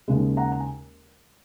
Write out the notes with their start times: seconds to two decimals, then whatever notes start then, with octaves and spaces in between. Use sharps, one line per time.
0.08 D#2 C#3 G#3
0.37 F#5 A#5
0.52 A#5
0.60 G#5